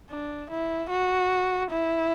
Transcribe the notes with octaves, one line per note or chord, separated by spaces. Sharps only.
D4
E4
F#4
E4